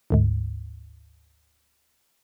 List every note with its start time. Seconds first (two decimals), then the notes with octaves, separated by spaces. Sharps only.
0.10 G1 D2 G#2